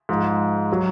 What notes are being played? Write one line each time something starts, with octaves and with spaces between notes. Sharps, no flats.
G#2 F3 G#3
F#3